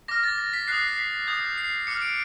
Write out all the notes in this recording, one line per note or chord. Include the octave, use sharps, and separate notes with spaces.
D6 F6 A#6
A6
A#6
B6
D#6 F#6 C7
C7
B6
D#6 G6
C7
D6 F6 C#7
C#7
D7